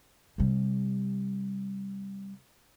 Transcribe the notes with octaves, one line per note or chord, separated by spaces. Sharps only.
C3 G3